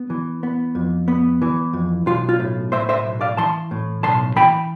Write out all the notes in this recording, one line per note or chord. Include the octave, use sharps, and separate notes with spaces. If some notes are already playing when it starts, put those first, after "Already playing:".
Already playing: B3
E3
B3
F2
B3
E3
F2
B1 F4
F4
A2
A2 C5 E5
C5 E5
B1
D5 F5
E3 A5 C6
A2
B1 A5 C6
E3 G5 B5